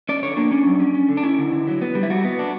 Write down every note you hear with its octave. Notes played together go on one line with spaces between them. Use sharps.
C#4 D5
D3 C#5
A#3 D4
C#4
F#3
C#4
C#4
D3
D4
C#4 E4
D3
D3
F#3
B3
G3
E4
G3 F#4
B3
D4